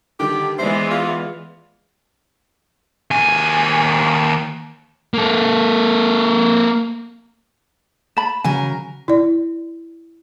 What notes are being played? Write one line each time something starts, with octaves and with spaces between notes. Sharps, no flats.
D3 D#3 G3 G4
E3 G#3 B3 C5 D5 E5
F4
D#2 G#5
A#3 A4
A5 B5
C#3 F#3 A#4 G#5
E4 D5